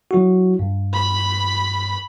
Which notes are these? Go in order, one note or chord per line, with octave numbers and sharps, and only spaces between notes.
F#3 E4 F#4
G2
B5